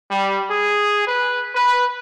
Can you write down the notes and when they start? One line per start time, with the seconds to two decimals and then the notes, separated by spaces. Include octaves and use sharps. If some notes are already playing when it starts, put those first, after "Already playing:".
0.11 G3
0.50 G#4
1.08 B4
1.55 B4